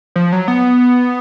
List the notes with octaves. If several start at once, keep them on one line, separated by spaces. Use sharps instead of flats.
F3
F#3
B3